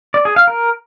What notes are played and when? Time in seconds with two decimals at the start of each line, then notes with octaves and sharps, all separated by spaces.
0.14 D5
0.25 G#4
0.36 F5
0.48 A#4